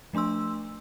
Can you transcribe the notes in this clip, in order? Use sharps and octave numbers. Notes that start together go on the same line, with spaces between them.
F3 A3 D4 C6 E6